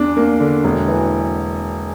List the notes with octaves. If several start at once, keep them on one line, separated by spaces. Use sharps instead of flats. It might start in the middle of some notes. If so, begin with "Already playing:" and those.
Already playing: E2 D4
A#3
D3
E1
E3